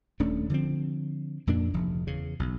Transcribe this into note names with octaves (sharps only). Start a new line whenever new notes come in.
D#1 A3 C#4 D4
D3 F3 C4
F2 A#2 A#3 D4
F1 D2 F3
E2 C#3
B1